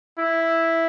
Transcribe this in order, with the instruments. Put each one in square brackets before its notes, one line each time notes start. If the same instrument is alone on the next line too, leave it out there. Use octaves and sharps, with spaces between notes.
[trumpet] E4